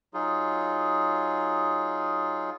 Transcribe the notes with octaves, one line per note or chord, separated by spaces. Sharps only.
F#3 D#4 F4 G#4